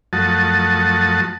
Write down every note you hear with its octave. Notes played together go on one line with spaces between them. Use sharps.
F#2 F3 A3 F#4 A5 D#6